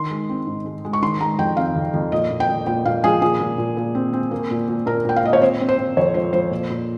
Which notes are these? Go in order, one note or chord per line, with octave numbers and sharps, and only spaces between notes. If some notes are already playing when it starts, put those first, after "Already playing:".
Already playing: D#3 C6
G#3
C4
G#2
G#3
G#3
C#6
D#3 C6
G#3 A#5
F2 G5
C4 F5
F2
F2
A#2 D#5
A#2
G5
A#2
A#2 G5
A#2 F5
F3 G#4
A#2 G#4
A#2
A#2
A#2
C4
C4
A#3
A#2
A#2
A#2 A#4
A#2 G5
F5
A#2 D#5
C#5
C4 C5
C4
C5
C4
F2 C#5
F3 C5
F3 C5
A#2
A#2